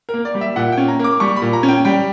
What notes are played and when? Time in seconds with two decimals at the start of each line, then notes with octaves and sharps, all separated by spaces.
0.09 A#4
0.14 A#3
0.25 D5
0.35 G3
0.41 E5
0.56 A#2 F#5
0.72 G5
0.77 C#4
0.88 A#5
0.99 A#3 D6
1.20 G3 C#6
1.36 B5
1.42 A#2
1.53 A#5
1.63 C#4
1.69 G5
1.85 G3 G5